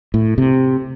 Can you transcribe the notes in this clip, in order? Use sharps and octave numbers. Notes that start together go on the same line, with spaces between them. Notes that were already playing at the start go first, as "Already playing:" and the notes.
A2
C3